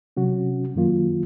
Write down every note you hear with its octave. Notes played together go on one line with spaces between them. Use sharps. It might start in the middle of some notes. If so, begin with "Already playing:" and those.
C3 F#3 C#4 F#4
F#2 D#3 F#3 A#3 F4